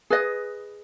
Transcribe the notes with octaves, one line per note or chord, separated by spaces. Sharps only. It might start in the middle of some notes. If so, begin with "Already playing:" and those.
G#4 B4 D#5